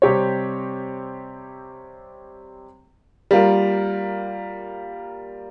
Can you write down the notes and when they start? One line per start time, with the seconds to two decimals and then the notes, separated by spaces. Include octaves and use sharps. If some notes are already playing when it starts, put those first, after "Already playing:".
0.02 C3 G3 C4 G4 C#5
3.31 G3 A#3 F4 A#4